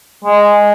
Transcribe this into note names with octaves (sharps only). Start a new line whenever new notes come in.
G#3